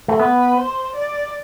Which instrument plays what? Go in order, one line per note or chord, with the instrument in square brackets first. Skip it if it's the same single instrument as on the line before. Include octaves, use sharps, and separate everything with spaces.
[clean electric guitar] A3
[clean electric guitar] B3 [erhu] B4
[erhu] C5
D5